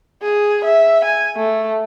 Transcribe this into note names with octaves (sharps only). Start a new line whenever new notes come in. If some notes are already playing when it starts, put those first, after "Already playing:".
G#4
E5
G#5
A3